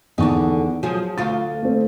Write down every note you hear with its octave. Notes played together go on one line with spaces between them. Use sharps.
E2 D3 D#3 D4 D#4 C#6
F3 F#3 G#4
D2 F4 A6
A3 C4